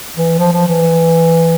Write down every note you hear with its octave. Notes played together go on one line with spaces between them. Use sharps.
E3
F3
F3
E3